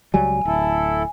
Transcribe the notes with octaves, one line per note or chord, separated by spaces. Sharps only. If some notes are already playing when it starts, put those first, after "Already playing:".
C#2 F#3 G3 G#5
D1 E4 A4